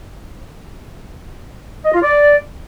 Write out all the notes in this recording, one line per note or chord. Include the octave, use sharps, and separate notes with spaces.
D#5
F4
D5